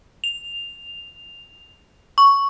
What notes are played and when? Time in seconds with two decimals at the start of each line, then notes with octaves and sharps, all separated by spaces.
0.24 F7
2.18 C#6